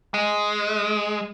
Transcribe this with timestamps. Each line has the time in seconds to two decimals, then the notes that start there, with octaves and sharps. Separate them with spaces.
0.14 G#3